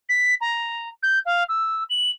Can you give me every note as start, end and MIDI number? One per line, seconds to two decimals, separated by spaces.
0.09 0.34 95
0.40 0.89 82
1.02 1.19 91
1.25 1.43 77
1.48 1.83 88
1.89 2.10 102